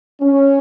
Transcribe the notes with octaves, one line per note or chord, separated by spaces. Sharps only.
C#4